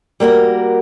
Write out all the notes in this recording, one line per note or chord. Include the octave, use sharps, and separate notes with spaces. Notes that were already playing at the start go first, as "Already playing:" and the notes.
G3 A#3 F#4 A#4